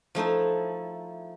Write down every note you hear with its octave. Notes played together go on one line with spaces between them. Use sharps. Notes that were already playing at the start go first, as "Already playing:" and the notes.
F3 A3 D#4 E4